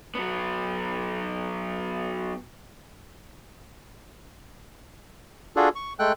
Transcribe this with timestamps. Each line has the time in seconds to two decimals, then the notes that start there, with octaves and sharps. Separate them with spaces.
0.15 F#3 B3
5.56 D4 F4 F#4 G#4 A4
5.75 C#6
5.99 G#3 A3 A4 G5 F#6